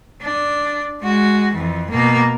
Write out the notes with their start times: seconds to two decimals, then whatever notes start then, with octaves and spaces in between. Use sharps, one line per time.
0.22 D4
1.02 G#3 F#4
1.54 F2 E3
1.91 B2 A#3